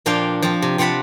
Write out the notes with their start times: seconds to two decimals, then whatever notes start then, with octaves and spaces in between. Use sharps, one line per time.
0.06 A#2 F3 D4 F4 F5 G5
0.42 F3 C4
0.62 C3
0.78 C3 C4 F4 F#5 A5 B5